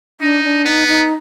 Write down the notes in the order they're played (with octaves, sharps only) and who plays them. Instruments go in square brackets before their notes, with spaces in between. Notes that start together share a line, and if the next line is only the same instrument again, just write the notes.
[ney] D4 [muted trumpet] D#4
[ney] D4
[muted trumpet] B3 [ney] D#4
[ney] D#4